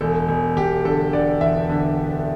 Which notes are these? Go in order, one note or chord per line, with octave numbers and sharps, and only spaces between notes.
E1 A4
E1
E1 G4
D3 A4
D3 D5
E2 E5
D3